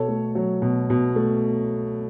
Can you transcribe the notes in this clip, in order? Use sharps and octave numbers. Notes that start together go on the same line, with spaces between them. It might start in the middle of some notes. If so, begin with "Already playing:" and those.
Already playing: B2 A4 C#5
A3
F#3
B2
B2
A3